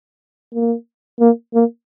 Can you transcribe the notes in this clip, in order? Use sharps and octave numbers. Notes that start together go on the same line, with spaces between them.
A#3
A#3
A#3